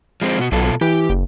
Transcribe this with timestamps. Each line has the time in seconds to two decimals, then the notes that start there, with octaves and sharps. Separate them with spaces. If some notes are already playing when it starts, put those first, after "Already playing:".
0.22 F3 G#3 C4
0.38 B2 F#4
0.52 B1 B2 F4 A4
0.81 E3 G4
1.10 F#1